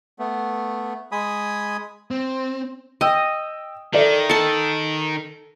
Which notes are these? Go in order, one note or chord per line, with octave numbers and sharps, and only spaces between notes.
A3 B3
G#3 G#5 B5 D#6
C4
D#5 G5 E6
D#3 A4 D5 E5
A4 A5 C#7